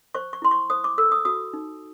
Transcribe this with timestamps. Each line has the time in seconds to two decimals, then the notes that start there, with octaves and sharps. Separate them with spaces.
0.15 C5 C#6
0.33 C#6
0.42 E4 C6
0.51 C#6
0.70 C5 D#6
0.84 D6
0.98 A4 E6
1.12 D#6
1.25 F#4 D#6
1.53 D#4